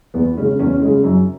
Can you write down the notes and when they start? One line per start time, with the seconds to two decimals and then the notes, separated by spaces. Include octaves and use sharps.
0.14 E2 B3
0.37 C#3 G#3 C#4
0.59 E2 C#4
0.82 C#3 G#3
1.03 F#2